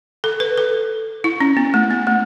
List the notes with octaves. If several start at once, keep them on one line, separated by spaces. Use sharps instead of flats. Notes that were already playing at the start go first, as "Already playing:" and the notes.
A4
B4
A4
E4
C#4
B3
A3
B3
A3